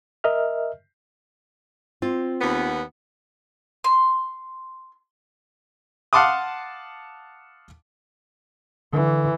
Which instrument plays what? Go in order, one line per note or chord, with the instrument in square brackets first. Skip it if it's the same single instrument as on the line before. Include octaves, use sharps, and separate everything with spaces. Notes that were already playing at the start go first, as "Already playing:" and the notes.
[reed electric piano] A#4 D#5 E5 F6
[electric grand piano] C4 [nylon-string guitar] F4
[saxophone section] D#2 B3
[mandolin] C6
[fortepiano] F5 F#5 A5 C6 D6 D#6
[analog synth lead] D3 [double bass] E3